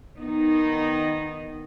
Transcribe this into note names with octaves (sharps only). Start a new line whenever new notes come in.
D#3 B3 D#4